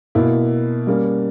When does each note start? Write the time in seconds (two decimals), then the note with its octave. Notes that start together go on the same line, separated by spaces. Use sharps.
0.15 B2 A#3 E4
0.87 G3 A#3 C#4